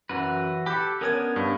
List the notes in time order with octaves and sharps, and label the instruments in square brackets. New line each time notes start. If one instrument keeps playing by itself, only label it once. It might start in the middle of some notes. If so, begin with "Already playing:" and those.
[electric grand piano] F#2 [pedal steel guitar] E3 F#4 B4
[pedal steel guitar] G4 A4 [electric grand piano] B5 F#6 G6
[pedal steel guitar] B3 C#4 D4 [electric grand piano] A#4 D#6 G#6
[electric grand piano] G2